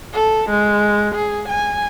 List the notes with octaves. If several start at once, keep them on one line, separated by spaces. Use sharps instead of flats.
A4
G#3
G#4
G#5